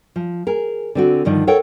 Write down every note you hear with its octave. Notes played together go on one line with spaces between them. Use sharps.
F3
G#4 A#4
D3 C4 F#4
G2 D3 D#3 F3
A4 A#4 C#5 F#5 G5